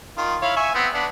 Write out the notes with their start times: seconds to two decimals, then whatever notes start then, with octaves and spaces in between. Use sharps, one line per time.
0.17 D#3 F4
0.42 E4 C#5 F5
0.57 E5 G#5 C#6
0.75 B3 C4
0.94 B3 D4